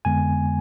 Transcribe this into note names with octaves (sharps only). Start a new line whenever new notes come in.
F2 D3 G#3 B3 G#5